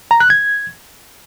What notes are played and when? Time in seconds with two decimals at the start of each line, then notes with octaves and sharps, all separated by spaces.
0.11 A#5
0.20 F#6
0.30 G#6